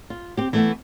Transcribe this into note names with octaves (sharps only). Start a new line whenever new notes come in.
F4
C4 G4
E3 A3 B3